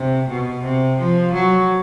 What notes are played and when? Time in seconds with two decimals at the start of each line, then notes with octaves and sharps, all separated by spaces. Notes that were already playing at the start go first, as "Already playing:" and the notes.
Already playing: C3
0.29 B2
0.64 C3
0.99 F3
1.33 F#3